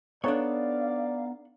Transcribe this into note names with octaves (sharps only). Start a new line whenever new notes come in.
B3 D4 D#4 A4 C#5 D5 F5